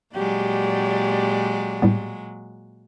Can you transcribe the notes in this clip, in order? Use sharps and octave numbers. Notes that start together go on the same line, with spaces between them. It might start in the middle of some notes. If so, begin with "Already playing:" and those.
A#2 F#3 G#3 G4 D5
A2 G3 B3